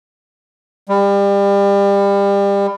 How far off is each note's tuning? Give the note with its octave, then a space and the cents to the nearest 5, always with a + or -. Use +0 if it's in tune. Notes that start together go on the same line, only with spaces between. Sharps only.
G3 +30